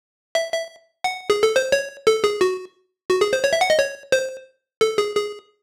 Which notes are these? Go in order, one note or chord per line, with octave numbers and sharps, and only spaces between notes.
E5
E5
F#5
G#4
A4
C5
C#5
A4
G#4
F#4
F#4
G#4
C5
C#5
E5
F#5
D#5
C#5
C5
A4
G#4
G#4